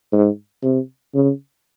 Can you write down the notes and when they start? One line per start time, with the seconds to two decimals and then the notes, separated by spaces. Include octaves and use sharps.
0.12 G#2
0.63 C3
1.14 C#3